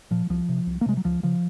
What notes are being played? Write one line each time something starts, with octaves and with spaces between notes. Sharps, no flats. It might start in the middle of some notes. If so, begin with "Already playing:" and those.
A#2 F3
C2 F3
C3
C2
A#3
C3 G#3
F#3
C#2 F3
C#3 F3